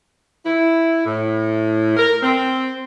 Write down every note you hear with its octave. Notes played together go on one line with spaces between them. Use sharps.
E4
A2
A#4
C4